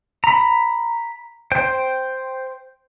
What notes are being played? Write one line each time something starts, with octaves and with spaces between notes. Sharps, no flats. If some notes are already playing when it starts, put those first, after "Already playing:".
A#5 B5
C5 G5